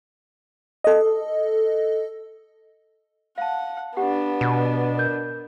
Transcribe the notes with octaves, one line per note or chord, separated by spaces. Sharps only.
A4 D#5
F5 F#5 A5
B3 D4 G4 F#5
B2
A#4 G6